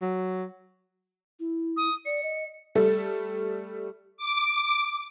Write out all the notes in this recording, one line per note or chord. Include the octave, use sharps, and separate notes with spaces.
F#3
E4
D#6
D5 C#7
D#5
G3 A3 A4
D6